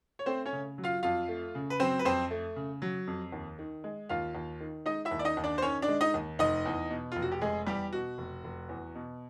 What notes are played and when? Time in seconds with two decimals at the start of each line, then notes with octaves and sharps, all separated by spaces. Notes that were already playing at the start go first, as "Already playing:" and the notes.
0.19 C#5
0.26 A3 C4 C5
0.46 C#4 C#5
0.52 C#3
0.78 F#3
0.84 F4 F5
1.03 F2 F4 F5
1.28 A3
1.55 C#3
1.70 B4
1.80 F#3 C4 C5
1.99 B4
2.05 F2 C4 C5
2.31 A3
2.56 C#3
2.82 F#3
3.07 F2
3.32 D#2
3.59 D#3
3.84 G#3
4.09 D#2 F4 F5
4.35 D#2
4.60 D#3
4.86 G#3 D#4 D#5
5.05 E4 E5
5.11 D#2
5.19 D5
5.25 D#4 D#5
5.37 D#2
5.44 D4 D5
5.58 C5
5.62 D#3 C#4 C#5
5.82 D4 D5
5.88 G#3
6.01 D#4 D#5
6.14 D#2
6.39 F1 D#4 D#5
6.66 E2
6.90 B2
7.12 F1 F4
7.22 F#4
7.32 G4
7.41 F1 G#3 G#4
7.67 E2 G3 G4
7.93 B2 F#4
8.18 F1
8.44 F1
8.69 E2
8.95 B2